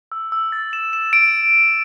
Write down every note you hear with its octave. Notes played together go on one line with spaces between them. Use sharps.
E6
E6
A6
E7
E7
D7